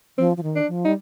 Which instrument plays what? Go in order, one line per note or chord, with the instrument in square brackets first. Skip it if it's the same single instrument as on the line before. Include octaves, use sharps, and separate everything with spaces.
[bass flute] F3 [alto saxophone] C4
[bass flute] F3
D#3
[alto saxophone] D4
[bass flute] F3
[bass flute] G3 [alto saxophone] D#4